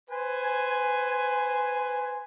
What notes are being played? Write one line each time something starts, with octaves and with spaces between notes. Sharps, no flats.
B4 C5 G#5